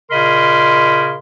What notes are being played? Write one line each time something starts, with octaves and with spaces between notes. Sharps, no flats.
A#2 C#3 A#4 D#5 B5 C6